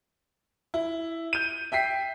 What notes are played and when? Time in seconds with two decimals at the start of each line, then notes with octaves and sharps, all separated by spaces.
0.74 E4
1.33 G6 D#7
1.72 E5 G5 B6 C7